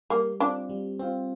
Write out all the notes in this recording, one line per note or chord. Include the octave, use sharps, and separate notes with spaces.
G3 A#3
C4 D4 F4
G3
C4 F4